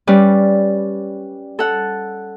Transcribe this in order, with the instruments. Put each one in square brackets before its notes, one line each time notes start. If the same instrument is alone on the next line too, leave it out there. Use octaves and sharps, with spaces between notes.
[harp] G3 C#4 B4 D5
A4 F#5